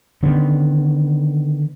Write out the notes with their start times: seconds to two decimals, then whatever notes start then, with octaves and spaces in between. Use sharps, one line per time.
0.23 D3 D#3 B3 C#4